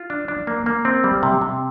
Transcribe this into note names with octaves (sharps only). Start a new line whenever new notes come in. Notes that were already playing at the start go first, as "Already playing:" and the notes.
Already playing: F4
D4
D4
A#3
A#3
C4
G3
C3
C3